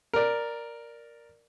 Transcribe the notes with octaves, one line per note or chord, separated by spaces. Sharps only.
A#4 D5